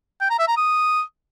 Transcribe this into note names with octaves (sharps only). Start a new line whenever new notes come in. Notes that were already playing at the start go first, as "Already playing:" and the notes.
G5
A#5
E5
A#5
D#6